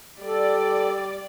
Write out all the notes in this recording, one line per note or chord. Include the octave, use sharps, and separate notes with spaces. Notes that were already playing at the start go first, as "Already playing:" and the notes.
G3 A4 D5